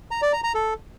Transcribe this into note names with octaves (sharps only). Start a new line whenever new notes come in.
A#5
D5
A#5
A#5
A4